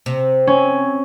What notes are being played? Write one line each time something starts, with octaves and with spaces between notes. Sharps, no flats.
C3
C#4